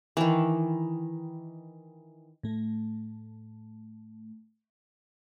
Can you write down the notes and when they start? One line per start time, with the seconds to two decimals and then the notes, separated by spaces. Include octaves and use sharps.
0.17 D#3 E3
2.43 A2 A3